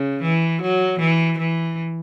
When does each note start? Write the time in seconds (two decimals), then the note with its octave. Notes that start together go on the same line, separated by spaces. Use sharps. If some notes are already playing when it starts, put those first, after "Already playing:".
Already playing: C#3
0.22 E3
0.62 F#3
1.00 E3
1.39 E3